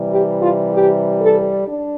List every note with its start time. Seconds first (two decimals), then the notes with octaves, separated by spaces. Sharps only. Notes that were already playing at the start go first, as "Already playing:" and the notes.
Already playing: C3 E3 G3
0.11 G4
0.41 F4
0.73 G4
1.20 A4
1.67 D4